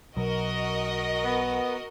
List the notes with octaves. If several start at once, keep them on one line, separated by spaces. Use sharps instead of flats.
B1 B2 F#3 F#4 A#4 D#5
B3